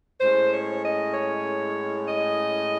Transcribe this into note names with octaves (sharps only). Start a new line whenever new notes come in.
A2 G#3 C#4 C5
C#5
D#5
C#5
D#5